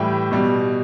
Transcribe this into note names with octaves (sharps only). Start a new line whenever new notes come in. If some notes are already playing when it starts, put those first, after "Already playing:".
Already playing: A2 E3 G3 E5 G5
B2 G3